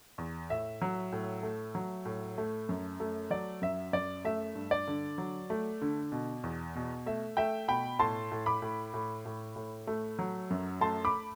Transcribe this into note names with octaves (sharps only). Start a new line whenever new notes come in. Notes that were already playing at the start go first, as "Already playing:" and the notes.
E2
A2 E5
F#3
A2
A3
F#3
A2
A3
F#2
A3
F#3 D5
F#2 E5
F#2 D5
A3 E5
G2
D5
D3
F#3
A3
D3
B2
E2
B2
A3 E5
A3 E5 G5
B2 G5 B5
A2 A5 C6
A2
B5 D6
A2
A2
A2
A2
A3
F#3
F#2
A3 A5 C6
B5 D6